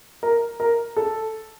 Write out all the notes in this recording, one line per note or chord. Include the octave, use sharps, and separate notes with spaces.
A#4
A#4
A4